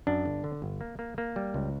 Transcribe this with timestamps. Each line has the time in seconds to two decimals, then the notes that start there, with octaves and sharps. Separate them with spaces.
0.07 F#2 D4
0.26 G1
0.44 D3
0.62 G1
0.81 A#3
0.99 A#3
1.18 A#3
1.36 G3
1.54 C#2